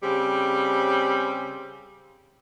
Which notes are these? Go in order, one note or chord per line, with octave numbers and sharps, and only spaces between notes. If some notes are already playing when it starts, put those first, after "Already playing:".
C#3 G3 C4